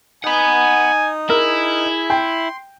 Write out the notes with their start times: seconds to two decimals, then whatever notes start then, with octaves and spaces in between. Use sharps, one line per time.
0.24 D#4 F#5 G#5 B5
1.30 E4 G#4 A#4
2.10 G5 C6